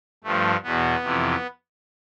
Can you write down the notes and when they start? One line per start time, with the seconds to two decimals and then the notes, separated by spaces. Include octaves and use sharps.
0.24 G2 F3 A3
0.63 E2 B2 B3
1.03 F2 C3 E3